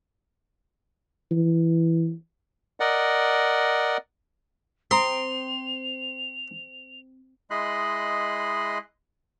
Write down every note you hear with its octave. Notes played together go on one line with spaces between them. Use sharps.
E3
A#4 D5 D#5 F#5
C4 A#5 C6 D#6 F7
G#3 E4 D#5 B5 C6 F#6